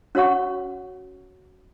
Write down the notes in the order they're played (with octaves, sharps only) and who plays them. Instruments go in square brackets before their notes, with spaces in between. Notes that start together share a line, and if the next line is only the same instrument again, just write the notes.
[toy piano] C#4 F#4 C#5 F#5 C#6